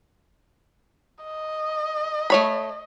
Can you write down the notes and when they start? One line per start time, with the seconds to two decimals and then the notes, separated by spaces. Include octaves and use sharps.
1.24 D#5
2.30 A3 C#5 B5